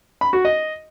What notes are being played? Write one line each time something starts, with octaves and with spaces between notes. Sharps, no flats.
B5
F#4
D#5